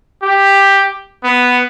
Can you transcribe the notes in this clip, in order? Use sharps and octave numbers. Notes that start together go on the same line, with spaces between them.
G4
B3